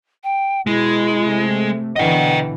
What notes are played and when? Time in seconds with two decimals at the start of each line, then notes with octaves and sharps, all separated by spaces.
0.24 G5
0.67 B2 G#3 E4
1.23 C3 A3
1.96 B2 D3 E3 D#5 F#5 G5